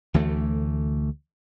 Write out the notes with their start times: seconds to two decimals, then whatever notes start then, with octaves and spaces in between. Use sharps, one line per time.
0.14 D2 E3 A3